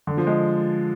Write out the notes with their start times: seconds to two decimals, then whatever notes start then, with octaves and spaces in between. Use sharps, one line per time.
0.07 D3
0.17 F3
0.27 G#3